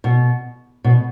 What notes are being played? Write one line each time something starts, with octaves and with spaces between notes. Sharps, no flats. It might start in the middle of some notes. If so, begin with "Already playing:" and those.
B2
B2